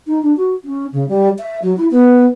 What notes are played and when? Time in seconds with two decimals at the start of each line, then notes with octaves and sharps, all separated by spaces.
0.07 D#4
0.23 D4
0.37 F#4
0.64 C#4
0.92 C#3
1.08 G3
1.39 E5
1.62 F#3
1.77 E4
1.91 B3